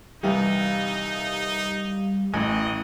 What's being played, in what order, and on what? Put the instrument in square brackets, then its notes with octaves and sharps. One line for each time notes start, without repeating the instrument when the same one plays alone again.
[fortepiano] C2 E3 [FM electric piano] G3 G4 F5 [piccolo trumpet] D#4
[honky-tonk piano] A1 [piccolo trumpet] D#5 [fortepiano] G#5